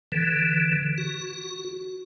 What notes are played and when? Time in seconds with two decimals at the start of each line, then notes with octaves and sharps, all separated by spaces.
0.12 D3 E3
0.98 F#4